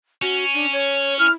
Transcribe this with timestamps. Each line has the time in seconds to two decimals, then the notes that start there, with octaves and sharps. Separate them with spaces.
0.22 C#4 F#4
0.54 D4
0.73 C#5
1.19 E4 F6